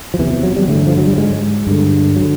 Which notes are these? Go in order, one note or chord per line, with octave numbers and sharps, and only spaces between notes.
F3
E2 C3 E3
F#3
G3
G2 D3 A3
F3
F#3
G3
G#2 G#3
G2 D3
F#3
D3